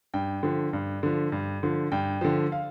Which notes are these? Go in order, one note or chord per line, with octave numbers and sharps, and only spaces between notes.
G2 G5
D3 F3
G2
D3 F3
G2
D3 F3
G2 G5
D3 F3
F5